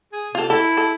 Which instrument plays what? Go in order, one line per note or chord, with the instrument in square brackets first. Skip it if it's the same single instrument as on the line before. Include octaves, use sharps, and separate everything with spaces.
[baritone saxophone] G#4
[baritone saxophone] C3 [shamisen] F4 A4
[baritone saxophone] E4 [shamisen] A4
[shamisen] A4